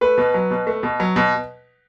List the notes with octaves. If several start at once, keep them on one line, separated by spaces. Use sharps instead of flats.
A3 B4
B2
F#3
B2
A3
B2
F#3
B2